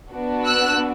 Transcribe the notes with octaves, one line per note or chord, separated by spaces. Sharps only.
B3 D4 F#4
E6 F#6